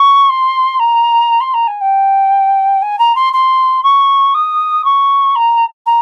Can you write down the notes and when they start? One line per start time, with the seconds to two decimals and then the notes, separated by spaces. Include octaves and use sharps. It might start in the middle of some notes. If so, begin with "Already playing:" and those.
Already playing: C#6
0.29 C6
0.80 A#5
1.41 C6
1.54 A#5
1.68 G#5
1.81 G5
2.82 G#5
2.99 A#5
3.16 C6
3.33 C6
3.83 C#6
4.34 D#6
4.85 C#6
5.35 A#5
5.86 A#5